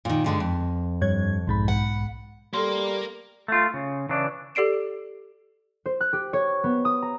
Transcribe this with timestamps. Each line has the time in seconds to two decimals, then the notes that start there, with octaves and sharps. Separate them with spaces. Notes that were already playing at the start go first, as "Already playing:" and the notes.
0.05 A#2 D#3
0.24 G2 D3 G#3
0.40 F2
1.01 G2 C#5 G#6
1.47 B1 G#2 B5
1.68 F#5
2.54 G3 A#3 A4 A#4 C6
3.48 A3 F4
3.74 C#3
4.09 C#3 E3 D4
4.55 G4 A4 D5 C7 D7 E7
5.86 C5
6.01 F#6
6.13 G4
6.33 C#5
6.64 B3
6.85 D#6
7.02 A#5